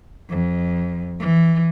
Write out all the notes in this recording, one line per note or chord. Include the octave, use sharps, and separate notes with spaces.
F2
E3